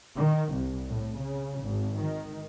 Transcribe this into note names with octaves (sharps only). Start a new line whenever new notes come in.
D#3
C2
A2
C#3
G#1
D#3